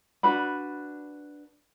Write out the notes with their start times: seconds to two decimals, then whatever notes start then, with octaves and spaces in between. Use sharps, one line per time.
0.23 D4 F#4 B4 B5